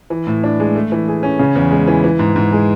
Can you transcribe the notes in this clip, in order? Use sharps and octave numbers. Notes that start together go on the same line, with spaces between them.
E3
A2
D4
G#3
A3
E3
G#4
C#4
C#3
E2
G#3
E3
E3
G#2
G#2
G#3